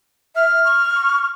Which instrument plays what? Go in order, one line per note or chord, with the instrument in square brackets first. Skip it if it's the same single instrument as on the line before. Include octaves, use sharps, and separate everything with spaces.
[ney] E5 [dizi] F6
[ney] C#6